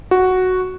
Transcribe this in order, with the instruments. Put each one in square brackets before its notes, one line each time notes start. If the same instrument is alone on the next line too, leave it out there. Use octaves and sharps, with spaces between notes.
[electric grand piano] F#4